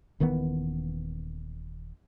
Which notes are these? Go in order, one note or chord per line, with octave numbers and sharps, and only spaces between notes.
D#1 D#3 E3 B3